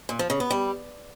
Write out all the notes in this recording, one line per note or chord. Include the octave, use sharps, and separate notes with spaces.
A#2
F3
C#3
B3
G3